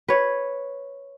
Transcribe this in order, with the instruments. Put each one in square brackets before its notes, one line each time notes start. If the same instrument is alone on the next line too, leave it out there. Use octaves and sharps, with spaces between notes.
[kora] B4 C#5